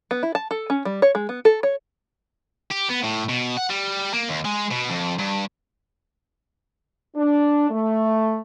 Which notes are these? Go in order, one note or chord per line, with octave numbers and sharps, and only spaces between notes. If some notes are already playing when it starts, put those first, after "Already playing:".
B3
E4
A5
A4
C#4
G3
C#5
G#3
B3
A4
C#5
G4
B3
A2
B2
F#5
G3
A#3
D#2
G#3
B2
F2
G2
D4
A3